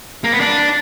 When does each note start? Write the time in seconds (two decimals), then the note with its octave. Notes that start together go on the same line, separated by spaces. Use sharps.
0.24 A#3
0.32 B3
0.41 D4